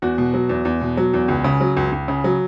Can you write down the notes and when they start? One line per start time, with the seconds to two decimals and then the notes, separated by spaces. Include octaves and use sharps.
0.02 E2 F#4
0.18 B2
0.34 F#3
0.49 E2
0.65 E2
0.81 B2
0.97 F#3
1.14 E2
1.28 C#2
1.44 C#3
1.61 F#3
1.77 C#2
1.92 C#2
2.08 C#3
2.24 F#3